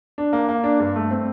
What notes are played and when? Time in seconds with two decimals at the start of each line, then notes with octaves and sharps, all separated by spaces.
0.18 D4
0.33 A#3
0.49 A#3
0.64 D4
0.80 G2
0.96 A3
1.11 C4